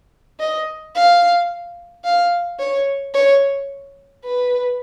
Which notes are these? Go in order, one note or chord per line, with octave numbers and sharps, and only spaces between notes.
D#5
F5
F5
C#5
C#5
B4